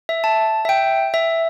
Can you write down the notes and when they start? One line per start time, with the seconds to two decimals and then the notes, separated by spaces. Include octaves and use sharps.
0.09 E5
0.24 A5
0.65 E5
0.69 G5
1.14 E5